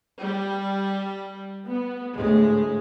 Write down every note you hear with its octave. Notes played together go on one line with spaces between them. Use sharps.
G3
B3
D2 A2 G#3